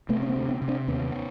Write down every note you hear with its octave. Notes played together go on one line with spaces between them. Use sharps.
C3 A3 B3
C#4
A#3 C4
D2
B3 C#4
C3
C4 D4
D#2 B3 C#4